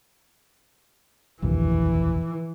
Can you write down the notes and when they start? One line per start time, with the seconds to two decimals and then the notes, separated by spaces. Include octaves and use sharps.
1.42 F1 A#1 D#2 E3